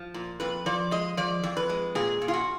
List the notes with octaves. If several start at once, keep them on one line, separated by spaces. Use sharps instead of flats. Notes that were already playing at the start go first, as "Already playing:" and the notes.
Already playing: F3
A#2
F2 B4
F3 D5
G#3 D#5
F3 D5
F2
B4
G#3
A#2 G#4
A#2
F4
F#4